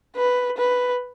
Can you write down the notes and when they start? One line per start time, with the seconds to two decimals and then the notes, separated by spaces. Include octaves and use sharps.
0.16 B4
0.57 B4